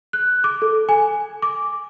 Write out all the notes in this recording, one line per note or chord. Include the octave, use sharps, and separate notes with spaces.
F#6
D6
A4
G#5
D6